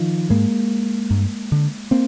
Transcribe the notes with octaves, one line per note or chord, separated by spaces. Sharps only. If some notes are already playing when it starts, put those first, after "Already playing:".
Already playing: D#3 F3
G#2 G#3 A#3
G2
D3
A#3 C4